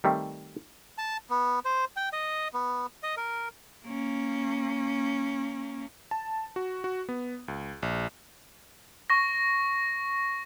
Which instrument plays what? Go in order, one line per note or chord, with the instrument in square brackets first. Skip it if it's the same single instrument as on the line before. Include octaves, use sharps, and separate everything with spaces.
[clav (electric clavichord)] D#3 G3 A3 C4
[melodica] A5
B3
C5
G5
D#5
B3
D#5
A#4
[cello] A#3 C#4
[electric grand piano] A5
F#4
F#4
B3
C#2
A#1
[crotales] C#6 A#6